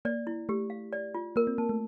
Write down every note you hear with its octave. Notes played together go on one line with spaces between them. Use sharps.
A#3 D5
E4
A3 G4
F5
D5
F4
A#3 A#4
C4
A#3 A5
A3